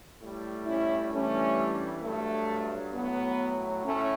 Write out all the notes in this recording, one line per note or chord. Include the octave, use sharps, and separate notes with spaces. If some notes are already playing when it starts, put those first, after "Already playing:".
A2 G3
C#4 E4
G2 E3 G3 A3 C#4
G2 F#3 A3
A2 F#3 B3
A2 A3 C#4